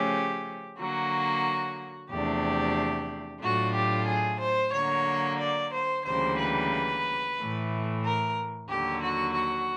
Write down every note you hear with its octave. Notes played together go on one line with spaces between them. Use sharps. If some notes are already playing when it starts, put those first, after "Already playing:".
Already playing: C#3 F3 A3 C#4 G4
D3 F#3 A#3 F#4
E2 C3 F3 A3 D4 G4
A2 F#3 A3 D4 F4 F#4
G4
G#4
C5
D3 F#3 A#3 C#5
D5
C5
D2 C#3 E3 G3 A#3 C5
B4
A2 E3 A3
A#4
D#2 D3 F#3 G4
F#4
F#4